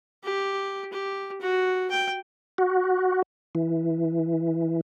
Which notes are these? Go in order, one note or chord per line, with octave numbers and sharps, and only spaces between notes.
G4
G4
F#4
G5
F#4
E3